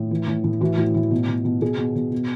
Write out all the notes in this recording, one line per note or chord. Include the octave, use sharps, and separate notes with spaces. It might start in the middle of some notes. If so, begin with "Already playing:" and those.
Already playing: A2
E3
A2
A2
E3 F#4
A2 F#4
A2 E4
B2
B2
B2
B2 G#4
B2
B2
B2